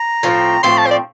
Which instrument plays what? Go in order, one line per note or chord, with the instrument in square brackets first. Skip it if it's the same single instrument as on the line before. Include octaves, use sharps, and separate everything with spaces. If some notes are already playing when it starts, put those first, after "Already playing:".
Already playing: [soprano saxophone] A#5
[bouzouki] A2 F3 C4
[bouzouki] A2 F3 C4 [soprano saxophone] C6
[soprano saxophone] A5
C5
D5